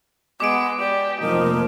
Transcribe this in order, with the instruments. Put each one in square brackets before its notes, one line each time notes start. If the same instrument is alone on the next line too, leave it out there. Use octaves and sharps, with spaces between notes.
[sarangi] G#3 [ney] B3 [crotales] D6 D7
[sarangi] G4 [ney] D5
[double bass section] F1 F3 A#3 [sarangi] D#4 [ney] A#4